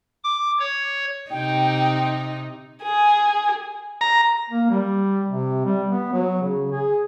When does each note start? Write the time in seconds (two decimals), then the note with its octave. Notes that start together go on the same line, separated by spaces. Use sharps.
0.24 D6
0.59 C#5
1.31 C3 D#4 G5
2.83 G#4
4.01 A#5
4.50 A#3
4.70 G3
5.29 C3
5.65 G3
5.90 B3
6.13 F#3
6.43 C#3
6.72 G#4